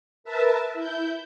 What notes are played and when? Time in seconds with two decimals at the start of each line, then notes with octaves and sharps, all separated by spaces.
0.24 A#4 B4 E5 A5
0.74 E4 G6